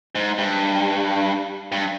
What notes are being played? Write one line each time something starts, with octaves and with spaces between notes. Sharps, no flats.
G#2
G2
G2